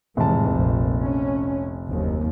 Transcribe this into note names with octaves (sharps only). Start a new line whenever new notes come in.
F1 A2 E3 G#3 A5
A#1 F2
C#4
F#1 D#2